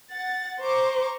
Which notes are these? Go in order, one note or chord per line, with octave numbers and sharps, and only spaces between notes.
F#5 A6
C5 A#5 C#6 D6